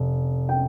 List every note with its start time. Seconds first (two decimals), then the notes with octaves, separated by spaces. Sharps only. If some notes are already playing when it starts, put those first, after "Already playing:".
Already playing: F1
0.49 G5